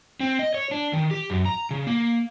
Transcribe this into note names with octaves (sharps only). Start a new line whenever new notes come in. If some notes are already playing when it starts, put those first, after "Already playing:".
C4
D#5
C#5
D4
D#3
G4
F#2
A#5
C#3
A#3